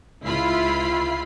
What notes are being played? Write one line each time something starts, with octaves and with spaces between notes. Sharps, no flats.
C#2 E4 F4 B5 C7